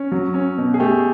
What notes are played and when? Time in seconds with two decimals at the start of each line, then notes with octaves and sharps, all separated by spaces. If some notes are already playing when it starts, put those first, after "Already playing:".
Already playing: C#4
0.12 F#3
0.34 C#4
0.58 B2
0.74 G#4
0.80 A3 G4